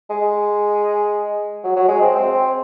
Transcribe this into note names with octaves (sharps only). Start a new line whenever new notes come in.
G#3
F#3
F#3
G#3
C4
C4